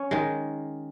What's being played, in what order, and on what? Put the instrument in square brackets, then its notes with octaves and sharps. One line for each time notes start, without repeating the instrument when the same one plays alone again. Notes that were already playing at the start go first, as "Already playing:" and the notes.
Already playing: [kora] C#4
D#3 G#3